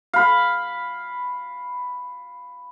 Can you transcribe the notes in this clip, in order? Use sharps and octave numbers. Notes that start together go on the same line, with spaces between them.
F5 B5